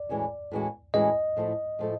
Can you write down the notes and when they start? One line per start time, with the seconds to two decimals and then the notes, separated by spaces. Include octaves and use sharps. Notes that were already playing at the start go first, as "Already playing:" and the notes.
Already playing: D5
0.09 A2 E3 G#3 C#4 F#4
0.52 A2 E3 G#3 C#4 F#4
0.94 A2 E3 G#3 C#4 F#4 D#5
1.37 A2 F3 A3
1.79 A2 F3 A3